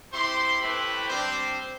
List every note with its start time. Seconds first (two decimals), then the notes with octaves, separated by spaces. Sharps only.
0.12 C4 E4 G4 C5 C6
0.61 A3 C4 E4 G4 B4 B5
1.09 G3 C4 D4 G4 C5